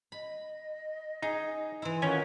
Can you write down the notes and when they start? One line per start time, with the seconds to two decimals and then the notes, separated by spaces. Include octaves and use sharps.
0.12 D#5 B5
1.22 D#4 G#4
1.82 E3 E4 C6
2.02 D#3 C#4 F4 F#4 A#4 G#5